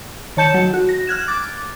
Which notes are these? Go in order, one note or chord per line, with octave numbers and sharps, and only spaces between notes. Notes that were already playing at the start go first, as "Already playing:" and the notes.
D#3 C#5 A5 G6 C#7 E7
F#3
F#4
A#6
F6 F#6 G#6 E7
D6 A6